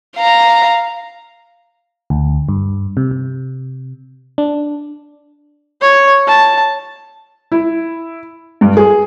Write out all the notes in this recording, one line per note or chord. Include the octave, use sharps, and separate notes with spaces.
F5 A#5
D2
G2
C3
C3
D4
C#5
A5
E4
G2
G#4